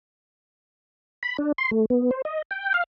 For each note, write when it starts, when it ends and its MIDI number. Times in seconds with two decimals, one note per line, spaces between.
1.23 1.37 83
1.38 1.52 62
1.58 1.71 84
1.71 1.85 57
1.90 2.11 59
2.11 2.22 72
2.25 2.42 75
2.51 2.73 79
2.74 2.84 77